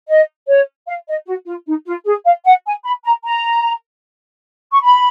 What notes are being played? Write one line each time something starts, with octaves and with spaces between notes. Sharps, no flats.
D#5
C#5
F5
D#5
F#4
F4
D#4
F4
G#4
F5
F#5
G#5
B5
A#5
A#5
C#6
B5